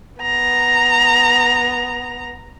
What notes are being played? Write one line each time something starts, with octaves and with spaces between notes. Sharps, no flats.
B3 A#5